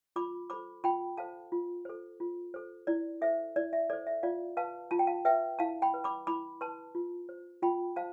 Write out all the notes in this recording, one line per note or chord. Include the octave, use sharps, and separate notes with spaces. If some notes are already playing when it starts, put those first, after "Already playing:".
F4 B5 D6
A4 C5 B5 D6
F4 G5 B5
A4 C5 F5 A5
F4
A4 C5
F4
A4 C5
E4 D5
A4 C5 E5
E4 D5
E5
A4 C5 D5
E5
F4 D5 F5
B4 F5 A5
F4 A5
G5
F5 A5
B4 E5 G5
E4 F5 A5
G5 B5
B4
B5 D6
E4 B5 D6
B4 A5 C6
F4
C5
F4 G5 B5
C5 F5 A5